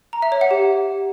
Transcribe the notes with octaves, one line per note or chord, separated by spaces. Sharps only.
A#5
E5
C#5
F#5
G4